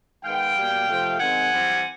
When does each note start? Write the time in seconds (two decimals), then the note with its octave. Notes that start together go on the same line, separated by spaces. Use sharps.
0.23 D#3 G#3 B3 F5 G5
0.55 B2 G3 A#3
0.87 C3 F3 A3 C4
1.19 D#3 G#3 C4 F#5 G#5
1.52 E3 G3 C4